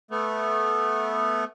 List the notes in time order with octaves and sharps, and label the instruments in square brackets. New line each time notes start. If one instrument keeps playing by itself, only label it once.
[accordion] A3 B3